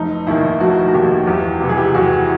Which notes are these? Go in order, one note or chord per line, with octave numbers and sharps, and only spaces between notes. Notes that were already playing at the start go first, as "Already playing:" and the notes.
Already playing: F1 D#4
D#2 D#3 E4
F1 F#4
F#4
D#2 D#3 G4
E2 G4
C3 E3 G4
G#4
G4
E2 F#4